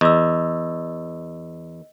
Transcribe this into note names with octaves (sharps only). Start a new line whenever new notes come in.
E2 D#5 E6